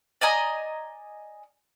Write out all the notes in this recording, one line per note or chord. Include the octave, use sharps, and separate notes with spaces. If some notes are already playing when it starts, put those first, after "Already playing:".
D5 D#5 G#5 A#5